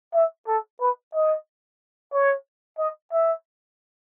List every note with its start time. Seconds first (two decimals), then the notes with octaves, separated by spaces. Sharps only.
0.14 E5
0.47 A4
0.80 B4
1.14 D#5
2.13 C#5
2.78 D#5
3.12 E5